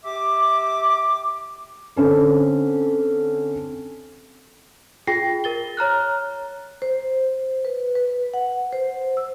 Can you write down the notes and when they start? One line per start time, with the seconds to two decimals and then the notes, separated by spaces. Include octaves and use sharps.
0.04 G4 E5 D6
1.96 D3 C4 C#4 A4
5.07 F4 G#4 G5 A#6 C7
5.44 A#4 A6 G7
5.77 C#5 A#5 F6 F#6
6.82 C5
7.65 B4
7.95 B4
8.34 F#5
8.73 C5
9.17 E6